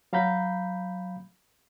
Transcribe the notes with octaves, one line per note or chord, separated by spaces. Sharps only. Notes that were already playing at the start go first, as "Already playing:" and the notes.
F#3 F5 A#5 B5 G6